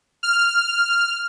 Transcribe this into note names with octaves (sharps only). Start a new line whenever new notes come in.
F6